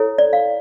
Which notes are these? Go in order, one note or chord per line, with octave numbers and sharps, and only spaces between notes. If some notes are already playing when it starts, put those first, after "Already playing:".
Already playing: E4 A4 C#5
D5
F5